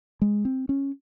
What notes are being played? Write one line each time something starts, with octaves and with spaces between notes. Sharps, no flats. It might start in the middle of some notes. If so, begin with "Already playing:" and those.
G#3
C4
C#4